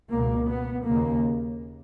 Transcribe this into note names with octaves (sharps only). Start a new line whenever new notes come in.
C#2 B2 A#3
B3
D#2 C#3 A#3